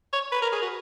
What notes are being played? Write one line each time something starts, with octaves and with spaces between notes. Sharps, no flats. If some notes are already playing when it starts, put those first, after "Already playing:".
C#5
B4
A#4
G#4
F#4